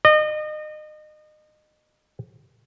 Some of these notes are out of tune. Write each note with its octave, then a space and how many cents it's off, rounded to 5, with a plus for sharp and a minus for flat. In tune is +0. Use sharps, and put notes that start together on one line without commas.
D#5 -30